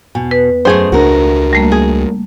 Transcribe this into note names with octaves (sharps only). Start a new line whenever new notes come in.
E2 B2
B4
F#2 G#3 A3 G#4 C5
C#2 C4 D4 F#4 A#4
G3 A3 A#3
G#4